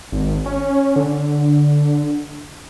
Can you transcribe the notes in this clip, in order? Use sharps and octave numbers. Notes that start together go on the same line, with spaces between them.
G#1
C#4
D3